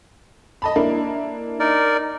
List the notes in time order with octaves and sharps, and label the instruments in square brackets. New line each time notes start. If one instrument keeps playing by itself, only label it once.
[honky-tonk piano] D#5 A5 B5
A#3 D4 E4
[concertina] D#4 A#4 D5